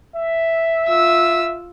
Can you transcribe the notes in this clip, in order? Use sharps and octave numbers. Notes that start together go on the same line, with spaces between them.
E5
F4 E6